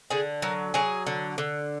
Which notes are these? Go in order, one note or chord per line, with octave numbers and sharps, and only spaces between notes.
D3 G#4
F#3 A#4
F#3 G#4
D3
D3